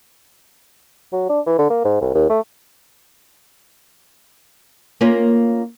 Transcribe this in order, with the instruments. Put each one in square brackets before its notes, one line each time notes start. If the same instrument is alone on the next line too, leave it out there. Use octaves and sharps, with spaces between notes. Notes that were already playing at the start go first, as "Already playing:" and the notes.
[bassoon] F#3
D4
E3
D3
A#3
G#2
C2
D#2
A3
[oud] A#3 C#4 F4